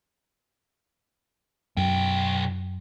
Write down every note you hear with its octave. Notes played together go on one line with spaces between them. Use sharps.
B1 F#2 G5